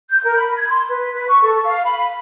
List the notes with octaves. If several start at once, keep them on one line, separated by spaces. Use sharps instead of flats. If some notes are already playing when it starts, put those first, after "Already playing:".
G6
A#4
B5
G#6
C6
B4
B4
C#6
A4
F5
B5